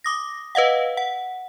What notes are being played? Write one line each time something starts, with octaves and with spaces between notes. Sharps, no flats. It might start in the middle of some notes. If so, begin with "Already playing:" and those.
D6 D#6 A#6
B4 D#5 F5 F#5
F#5